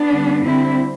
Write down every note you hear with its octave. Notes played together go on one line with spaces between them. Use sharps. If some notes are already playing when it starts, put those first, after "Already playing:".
Already playing: B3 D4
D3 G3
D3 G3 C4 E4